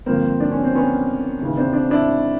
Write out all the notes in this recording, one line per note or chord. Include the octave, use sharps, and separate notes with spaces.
G2 D3 F3 A#3 C4
D4
C#4
C4
B3 C#4
D#2 C#3 E3
C4 D4
C4 D4
D4 E4